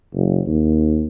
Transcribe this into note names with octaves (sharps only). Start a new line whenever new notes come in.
F#1
D#2